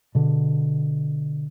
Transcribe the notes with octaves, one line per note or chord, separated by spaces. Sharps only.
B2 D3